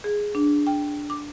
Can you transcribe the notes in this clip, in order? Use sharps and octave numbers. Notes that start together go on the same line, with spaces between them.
G#4
D4
G5
D6